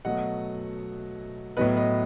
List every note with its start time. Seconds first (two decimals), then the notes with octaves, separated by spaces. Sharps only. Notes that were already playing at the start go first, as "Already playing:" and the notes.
0.04 B2 F#3 A3 D#5 F#5
1.57 A2 F#3 B3 B4 D#5
1.77 B4 D#5